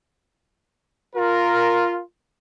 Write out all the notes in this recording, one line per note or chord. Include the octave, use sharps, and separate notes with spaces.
F4 A#4